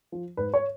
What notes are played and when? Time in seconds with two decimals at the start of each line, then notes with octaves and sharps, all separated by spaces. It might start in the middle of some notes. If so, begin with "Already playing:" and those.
0.12 F3
0.37 G#2 B4
0.54 C#5